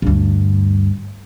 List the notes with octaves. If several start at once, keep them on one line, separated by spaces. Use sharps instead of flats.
D2 G2